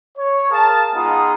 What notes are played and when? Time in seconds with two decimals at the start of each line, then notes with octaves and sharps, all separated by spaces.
0.18 C#5
0.51 G#4 A#4 F5 A5
0.95 G#3 B3 D#4 F4 G#4 D#6